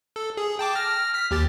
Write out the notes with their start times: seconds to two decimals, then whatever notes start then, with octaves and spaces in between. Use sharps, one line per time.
0.16 A4
0.37 G#4
0.59 G5 A5 D6
0.75 F6 A#6
1.14 F6 B6
1.31 D#2 G4 A6